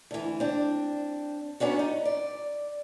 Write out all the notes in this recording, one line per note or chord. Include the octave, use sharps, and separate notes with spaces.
D2 E3
C4 D4
F#3 B3 C#4 D4 F#4
D#4
D5